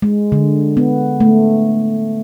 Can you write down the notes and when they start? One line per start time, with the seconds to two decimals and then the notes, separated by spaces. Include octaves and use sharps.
0.02 G#3
0.32 D3
0.77 B3
1.20 A3